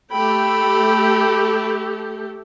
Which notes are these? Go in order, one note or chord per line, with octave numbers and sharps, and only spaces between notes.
A3 G4 A4 G5 B5